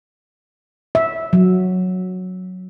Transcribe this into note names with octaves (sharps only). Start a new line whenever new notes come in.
E5
F#3